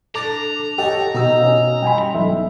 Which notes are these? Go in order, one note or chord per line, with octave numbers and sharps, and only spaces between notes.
D4 A4 A5 A#5 D6 A6
G4 A4 C#5 D#5 F#5 G5
B2 D#4 F#4 E6
C#4 F5
G3 G5 G#5 B5 C6
B1 E5